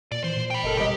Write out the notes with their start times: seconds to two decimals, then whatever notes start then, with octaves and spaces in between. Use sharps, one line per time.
0.12 A#2 D5
0.24 E3 C5
0.37 A#2
0.50 G5 B5
0.63 F#1 A4 A#4 D#5
0.77 E1 G3 G4 D#5